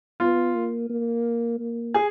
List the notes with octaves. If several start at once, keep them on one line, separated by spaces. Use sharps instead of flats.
B3 F4
A#3
A#3
A#3
G#4